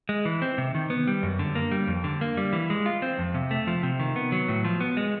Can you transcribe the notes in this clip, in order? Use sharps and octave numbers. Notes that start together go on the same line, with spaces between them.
G#3
E3
C4
C3
D#3
B3
G3
F#2
D3
A#3
G3
F2
D3
A#3
G3
E3
G#3
F4
C4
F2
C3
A3
F3
C3
D#3
B3
F#3
A2
F3
B3
G#3